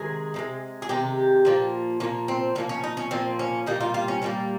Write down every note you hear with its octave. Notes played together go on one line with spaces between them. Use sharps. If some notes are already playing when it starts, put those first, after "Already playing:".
Already playing: C3 D#3 G#3 G#4
C3 D#3 G#3
G#4
C3 D#3 G#3 G4
A#2 F3 A#3
A#2 F3 A#3 C#4
C4
A#2 F3 A#3 C#4
C#4
D#4
C#4
A#2 F3 A#3 C4
C#4
A#2 G3 A#3 D#4
F4
F4
C#4
A#2 G3 A#3 C#4